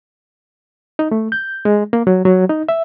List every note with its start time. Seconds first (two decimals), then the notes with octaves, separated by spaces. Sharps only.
0.99 D#4
1.11 A3
1.32 G6
1.65 G#3
1.93 A#3
2.07 F#3
2.25 F#3
2.49 D#4
2.69 E5